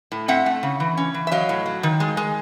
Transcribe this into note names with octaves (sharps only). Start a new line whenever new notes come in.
A2
C4 E5 F#5
A3
C#3
E3
C#4
E3
E5
F#3 D#5 F5
A2
F#3
D#3
G#3
G#3